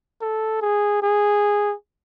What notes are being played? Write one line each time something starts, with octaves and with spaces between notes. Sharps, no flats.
A4
G#4
G#4